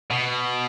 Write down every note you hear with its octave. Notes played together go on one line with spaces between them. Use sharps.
B2